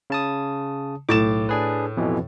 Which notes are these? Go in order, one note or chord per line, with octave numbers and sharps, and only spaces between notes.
C#3 A5 D#6
B1 A2 D6 A6 E7
D4 G#4 B4
F2 B2 E3